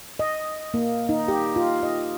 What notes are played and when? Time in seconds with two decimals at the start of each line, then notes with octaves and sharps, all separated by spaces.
0.19 D#5
0.74 A#3
1.09 D#4
1.28 G4
1.56 F4
1.83 D#5